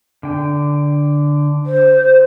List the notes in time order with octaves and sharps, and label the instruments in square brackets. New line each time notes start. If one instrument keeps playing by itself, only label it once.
[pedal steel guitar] D3 G5
[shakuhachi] C5